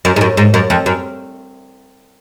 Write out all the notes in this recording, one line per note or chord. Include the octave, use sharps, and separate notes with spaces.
F#2
G#2
F#2
G#2
F#2
F2
F#2